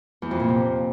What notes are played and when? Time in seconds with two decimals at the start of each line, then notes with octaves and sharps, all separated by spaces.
0.22 E2
0.31 F2
0.40 A#2
0.49 C3